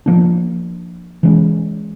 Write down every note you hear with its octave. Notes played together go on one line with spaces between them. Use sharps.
F3 A#3 D4
E3 G#3 C#4